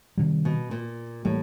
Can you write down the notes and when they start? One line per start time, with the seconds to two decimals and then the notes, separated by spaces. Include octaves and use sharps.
0.17 C3 D#3 G3
0.45 B2
0.71 A#2
1.25 A2 E3 G3 A#3